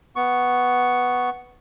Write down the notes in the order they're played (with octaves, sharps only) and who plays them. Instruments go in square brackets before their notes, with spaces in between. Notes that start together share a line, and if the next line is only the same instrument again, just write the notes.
[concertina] B3 C#6